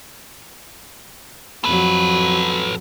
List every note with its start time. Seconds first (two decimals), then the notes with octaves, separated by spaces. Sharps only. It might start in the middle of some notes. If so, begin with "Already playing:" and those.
1.64 F2 F#3 A4 B4